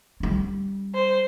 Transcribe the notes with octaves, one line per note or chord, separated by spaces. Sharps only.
G3 C#4
C5